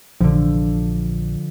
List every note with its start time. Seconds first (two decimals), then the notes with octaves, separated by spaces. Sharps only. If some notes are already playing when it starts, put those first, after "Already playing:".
0.21 A#1 D3 F3